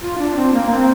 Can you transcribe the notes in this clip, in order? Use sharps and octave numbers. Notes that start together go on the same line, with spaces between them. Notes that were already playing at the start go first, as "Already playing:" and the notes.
F4
D4
C4
A#3
C4